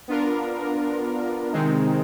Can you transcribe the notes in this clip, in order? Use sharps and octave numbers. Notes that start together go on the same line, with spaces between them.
B3 D4 F4 A#4
C3 D#3 G#3 C4 D#4